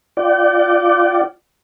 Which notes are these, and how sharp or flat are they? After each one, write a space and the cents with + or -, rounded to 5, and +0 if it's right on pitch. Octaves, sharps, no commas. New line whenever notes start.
F4 +0 D5 +0 G5 -40